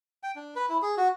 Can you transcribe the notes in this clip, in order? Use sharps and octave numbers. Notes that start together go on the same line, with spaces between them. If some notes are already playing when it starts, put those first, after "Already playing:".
G5
D4
B4
E4
G#4
F#4